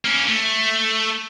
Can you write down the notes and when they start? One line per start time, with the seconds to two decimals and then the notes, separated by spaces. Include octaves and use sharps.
0.05 A#3 C#4
0.28 A3